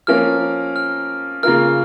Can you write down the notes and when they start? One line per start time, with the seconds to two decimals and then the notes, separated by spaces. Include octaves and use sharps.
0.07 F3 A#3 C#4 A#4 F6
0.76 F6
1.43 C#3 A#3 F4 A#4 F6